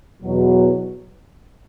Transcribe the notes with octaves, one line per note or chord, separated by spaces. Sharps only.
E2 B2 F#3